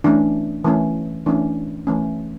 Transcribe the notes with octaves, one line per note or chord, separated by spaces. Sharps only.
E3 A3 C#4 D4
E3 A3 C#4
E3 A3 C#4 D4
E3 A3 C#4